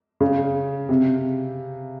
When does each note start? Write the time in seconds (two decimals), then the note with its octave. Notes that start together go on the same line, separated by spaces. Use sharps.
0.20 C#3
0.89 C3